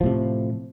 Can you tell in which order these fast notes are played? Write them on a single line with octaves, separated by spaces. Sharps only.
F3 A2 C3